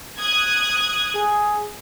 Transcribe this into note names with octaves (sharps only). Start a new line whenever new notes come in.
D#6 F#6 G#6
G#4